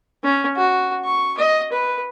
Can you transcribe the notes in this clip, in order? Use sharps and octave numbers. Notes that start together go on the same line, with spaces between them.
C#4
F#4
C#6
D#5
B4